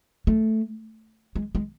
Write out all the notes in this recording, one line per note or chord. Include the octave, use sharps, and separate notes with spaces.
A3
G#3
G#3